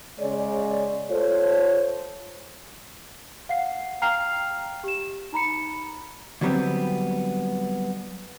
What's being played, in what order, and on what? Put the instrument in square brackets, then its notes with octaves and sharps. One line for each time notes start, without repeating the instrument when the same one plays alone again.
[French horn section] C#3 G#3 C#5 D5
A3 F4 A4 C5 C#5
[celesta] F5 F#5 C7
F5 G5 A#5 F6 C7 F7
G4 E7
D#4 A#5 B5 C#7
[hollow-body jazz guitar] D3 F#3 G3 A3 B3 C4